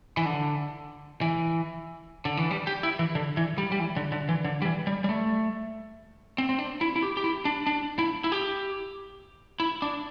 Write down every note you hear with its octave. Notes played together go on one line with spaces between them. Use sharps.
E3
D3
E3
D3
E3
G3
G4
E4
E3
D3
E3
G3
G3
E3
D3
D3
E3
D3
G3
E3
G3
G3
A3
C4
C4
D4
E4
E4
G4
G4
E4
D4
D4
E4
E4
G4
E4
D4